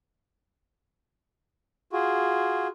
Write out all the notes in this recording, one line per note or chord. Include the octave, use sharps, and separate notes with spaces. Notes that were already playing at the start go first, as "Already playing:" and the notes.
F4 F#4 G#4